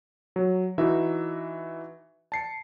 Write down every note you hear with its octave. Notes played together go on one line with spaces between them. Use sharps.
F#3
E3 D#4 F#4 E5
A5 C7 C#7